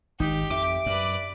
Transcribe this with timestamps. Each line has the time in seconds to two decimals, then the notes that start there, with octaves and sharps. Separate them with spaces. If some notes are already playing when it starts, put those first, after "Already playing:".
0.20 G#1 G#2 D#4 G4
0.50 F2 E5 D6
0.86 F#2 B4 D5